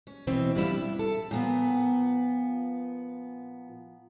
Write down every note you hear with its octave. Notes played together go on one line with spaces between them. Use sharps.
C#4
B2 E3 C4
A2 G3 D4 E4 F4
G2
A4
A#2 F3 B3